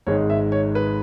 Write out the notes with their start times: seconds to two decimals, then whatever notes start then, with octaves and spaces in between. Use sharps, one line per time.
0.07 G#1 G#2 G#3 C#5
0.30 E5
0.52 C#5
0.75 B4